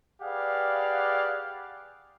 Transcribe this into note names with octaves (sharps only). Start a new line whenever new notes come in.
G4 G#4 B4 D5 F5 F#5